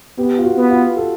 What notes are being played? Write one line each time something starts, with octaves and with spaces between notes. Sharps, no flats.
B3 G4
F4
F#4
B3
F4
A4